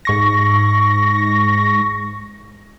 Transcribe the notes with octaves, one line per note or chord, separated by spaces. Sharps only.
G#2 C#6 A#6